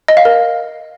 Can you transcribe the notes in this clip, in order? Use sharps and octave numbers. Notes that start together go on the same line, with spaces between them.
D#5
F5
A#4